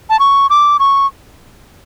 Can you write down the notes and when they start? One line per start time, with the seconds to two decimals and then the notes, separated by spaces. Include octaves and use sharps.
0.10 A5
0.20 C#6
0.50 D6
0.79 C#6